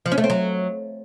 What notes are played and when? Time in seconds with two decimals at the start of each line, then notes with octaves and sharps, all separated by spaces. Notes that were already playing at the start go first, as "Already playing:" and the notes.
0.06 F3
0.12 C#4
0.18 A3
0.24 C4
0.30 F#3